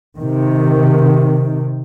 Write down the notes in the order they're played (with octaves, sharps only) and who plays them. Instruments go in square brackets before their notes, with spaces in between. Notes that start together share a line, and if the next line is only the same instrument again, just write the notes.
[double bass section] C3 D#3